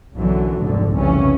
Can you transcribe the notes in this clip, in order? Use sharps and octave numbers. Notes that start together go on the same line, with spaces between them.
B1 F#2 D3 E3 F#3
F1 D2 G#2 D3
F1 C2 C#3 E3 C#4